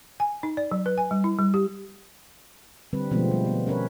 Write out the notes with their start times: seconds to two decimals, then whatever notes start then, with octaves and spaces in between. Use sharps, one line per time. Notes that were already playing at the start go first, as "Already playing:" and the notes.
0.20 G#5
0.43 D#4
0.57 D5
0.72 F#3
0.86 B4
0.98 G#5
1.11 G3
1.24 E4
1.39 G3
1.54 G4
2.93 D3 G3 C4 B4
3.11 B2 F3 G#3 A3 B3 C4
3.31 G3
3.46 G3 B3
3.66 C#4 A#4 B4 C#5